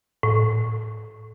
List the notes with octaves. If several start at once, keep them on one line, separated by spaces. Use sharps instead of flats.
A2